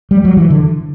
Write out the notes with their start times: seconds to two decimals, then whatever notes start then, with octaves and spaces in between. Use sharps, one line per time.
0.11 G3
0.25 F#3
0.37 E3
0.50 D3